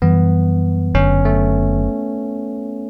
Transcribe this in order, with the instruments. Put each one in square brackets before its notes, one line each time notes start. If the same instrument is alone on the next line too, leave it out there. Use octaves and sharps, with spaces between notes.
[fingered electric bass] F#2 E3 G3 [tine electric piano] B3
[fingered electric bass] F#1 F#2 D3 [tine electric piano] C#4
[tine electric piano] A3